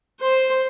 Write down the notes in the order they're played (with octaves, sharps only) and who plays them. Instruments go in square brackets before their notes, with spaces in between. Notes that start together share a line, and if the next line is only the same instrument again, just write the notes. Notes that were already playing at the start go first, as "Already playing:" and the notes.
[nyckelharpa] C5